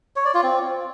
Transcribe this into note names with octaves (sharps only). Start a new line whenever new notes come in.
C#5
D5
F4
C4